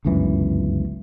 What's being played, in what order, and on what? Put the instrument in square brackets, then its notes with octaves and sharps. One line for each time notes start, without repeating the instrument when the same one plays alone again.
[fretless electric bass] G1 C#2 F#2 E3